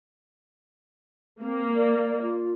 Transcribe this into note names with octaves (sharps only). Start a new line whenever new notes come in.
A#3 C4
D5
F4